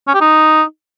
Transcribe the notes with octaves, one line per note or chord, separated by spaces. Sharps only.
C#4
G4
D#4